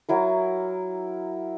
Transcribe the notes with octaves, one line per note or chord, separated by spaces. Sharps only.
F#3 E4 A#4